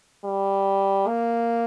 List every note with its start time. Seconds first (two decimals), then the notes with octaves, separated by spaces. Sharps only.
0.24 G3
1.07 A#3